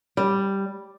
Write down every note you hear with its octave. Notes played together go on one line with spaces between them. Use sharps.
G3